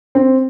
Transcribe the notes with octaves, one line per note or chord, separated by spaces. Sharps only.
C4